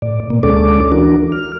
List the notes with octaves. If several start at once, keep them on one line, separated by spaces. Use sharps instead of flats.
A2 D5
B2 A#3
D2 G#3 C#4 A4 D5 D6
E3 D4 F#4 A#4
F6